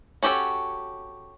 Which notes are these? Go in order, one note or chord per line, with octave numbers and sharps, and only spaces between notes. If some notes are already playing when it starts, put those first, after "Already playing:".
C#4 F#4 G4 A4 C#5